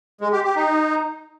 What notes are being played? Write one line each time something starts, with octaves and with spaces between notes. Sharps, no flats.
G#3
G4
G4
D#4